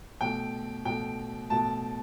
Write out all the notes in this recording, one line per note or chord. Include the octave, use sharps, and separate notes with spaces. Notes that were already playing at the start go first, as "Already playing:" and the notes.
B2 A3 G5
B2 A3 G5
B2 A3 A5